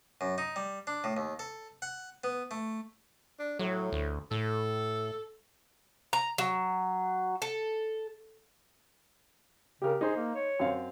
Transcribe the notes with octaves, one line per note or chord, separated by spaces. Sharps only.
F#2
D#4
G3
D4
A2
D#2
A4
F#5
B3
A3
D4
A2 F#3
D2
A2 A4
A#5
F#3
A4
C#3 G4 A#4
D#4 G#4 C5
A#3
C#5
F#2 C4 F5